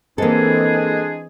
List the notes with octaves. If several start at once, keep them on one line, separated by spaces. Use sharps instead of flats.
E3 G#3 A#3 C4 D4 G#4 A4